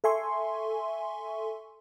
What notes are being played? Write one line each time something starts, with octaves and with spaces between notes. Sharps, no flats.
A4 E5 G#5 C6 C#6